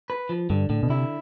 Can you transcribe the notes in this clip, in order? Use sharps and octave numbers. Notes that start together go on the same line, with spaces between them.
B4
F3
G2 D3
A2 D3
B2
C3 E4